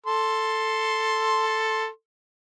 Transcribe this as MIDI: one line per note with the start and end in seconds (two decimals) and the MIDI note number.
0.06 1.87 69
0.06 1.87 84